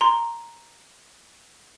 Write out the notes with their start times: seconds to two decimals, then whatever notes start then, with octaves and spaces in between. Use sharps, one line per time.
0.01 A#5 C6